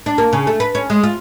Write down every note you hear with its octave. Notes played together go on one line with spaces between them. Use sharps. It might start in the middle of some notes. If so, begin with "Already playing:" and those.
D4
A#3
C#3
A3
B4
C#4
G#3
F4